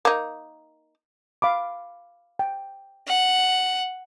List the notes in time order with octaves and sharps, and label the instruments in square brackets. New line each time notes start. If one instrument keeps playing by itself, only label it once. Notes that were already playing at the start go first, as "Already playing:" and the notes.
[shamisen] A#3 D#4
[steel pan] F5 B5 D6
G5
[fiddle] F#5